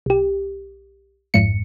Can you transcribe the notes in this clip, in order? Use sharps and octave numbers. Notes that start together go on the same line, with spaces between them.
B1 G4
G#1 F2 G#2 C#7